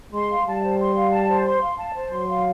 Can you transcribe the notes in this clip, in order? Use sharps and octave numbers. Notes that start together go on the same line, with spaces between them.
G#3 C6
F5
G3 A5
C5
C6
F5
A5
C5
C6
F5
A5
C5
F#3 C6
F5